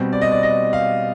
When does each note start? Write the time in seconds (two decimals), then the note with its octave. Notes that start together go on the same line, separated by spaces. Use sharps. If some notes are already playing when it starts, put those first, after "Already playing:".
Already playing: B2 G3 C4
0.13 D5
0.22 D#5
0.32 D5
0.43 D#5
0.73 F5